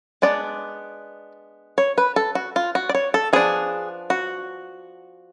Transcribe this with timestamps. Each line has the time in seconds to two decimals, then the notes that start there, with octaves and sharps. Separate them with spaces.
0.22 G#3 B3 D4 D5
1.78 C#5
1.98 B4
2.16 A4
2.35 F#4
2.56 F4
2.75 F#4
2.89 D5
2.94 C#5
3.14 A4
3.33 F3 B3 D4 G#4
4.10 F#4